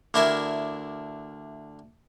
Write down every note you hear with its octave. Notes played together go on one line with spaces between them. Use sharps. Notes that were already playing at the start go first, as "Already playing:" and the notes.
D2 D4 E4 A#4 E5 G#5